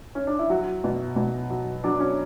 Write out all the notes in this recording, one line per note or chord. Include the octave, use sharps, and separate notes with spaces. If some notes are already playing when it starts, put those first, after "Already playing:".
C#4
D4
E4
F#3 F#4
B2
B2
F#3
F#3 D4
C#4